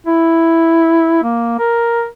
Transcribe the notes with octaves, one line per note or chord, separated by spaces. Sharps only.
E4
A#3
A#4